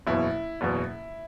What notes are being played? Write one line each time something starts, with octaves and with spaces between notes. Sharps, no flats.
F#1 E2 B2 E4
F#1 E2 B2